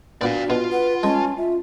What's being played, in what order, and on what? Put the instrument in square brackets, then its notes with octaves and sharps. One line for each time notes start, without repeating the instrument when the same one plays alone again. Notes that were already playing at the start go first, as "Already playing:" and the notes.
[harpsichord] A#2 B3 [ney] D4 [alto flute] F#4 [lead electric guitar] D5 F5
[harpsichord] B2 [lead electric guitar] F4
[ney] B4 [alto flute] F#5
[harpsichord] G#3 [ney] C#4 [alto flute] A5
[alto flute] F4 [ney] E5